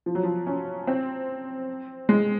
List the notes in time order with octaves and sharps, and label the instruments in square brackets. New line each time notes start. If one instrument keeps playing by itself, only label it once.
[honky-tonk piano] F3
F#3
F3
C#4
C4
G#3